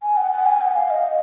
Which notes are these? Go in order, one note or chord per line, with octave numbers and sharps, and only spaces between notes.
G#5
F#5
F#5
G#5
F#5
F5
D#5